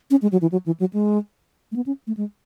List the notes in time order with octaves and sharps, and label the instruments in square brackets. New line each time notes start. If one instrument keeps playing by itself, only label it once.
[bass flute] C#4
G#3
F#3
E3
F#3
E3
F#3
G#3
A3
B3
C#4
A3
G#3